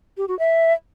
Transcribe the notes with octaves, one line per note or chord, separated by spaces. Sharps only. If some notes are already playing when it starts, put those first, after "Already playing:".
G4
F#4
E5